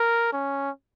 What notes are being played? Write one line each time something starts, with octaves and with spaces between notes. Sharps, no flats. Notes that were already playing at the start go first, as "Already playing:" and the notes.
Already playing: A#4
C#4